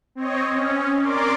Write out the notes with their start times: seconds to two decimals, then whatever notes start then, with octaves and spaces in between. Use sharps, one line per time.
0.15 C4 C#5 D#5
0.49 C#4
1.02 A#4 D5 C6 D6